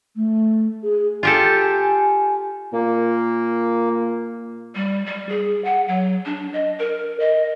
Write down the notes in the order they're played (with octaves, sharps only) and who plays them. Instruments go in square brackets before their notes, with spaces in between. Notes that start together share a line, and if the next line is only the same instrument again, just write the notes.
[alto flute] A3
G#4
[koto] F4 G4 A4 [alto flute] G#5
[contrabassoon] A#2 [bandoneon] A#3
[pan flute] G3
G3
G#4
F#5
F#3
D4
D#5
A#4
D#5